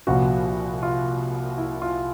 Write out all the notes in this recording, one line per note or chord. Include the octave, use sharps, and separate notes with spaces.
C2 A#2 F3 F#4
F4
E4
F4